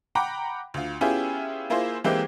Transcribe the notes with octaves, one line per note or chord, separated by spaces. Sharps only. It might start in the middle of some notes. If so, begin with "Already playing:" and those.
F#5 G5 A#5 B5 D6
D2 F4
B3 C#4 E4 F4 G4 G#4
A#3 E4 F4 G#4 C5
E3 G#3 A#3 C4 E4 G4